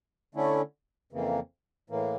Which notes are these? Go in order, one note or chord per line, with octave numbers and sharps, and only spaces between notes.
D3 A3 C#4 E4
F2 C#3 E3 A#3
A2 E3 A#3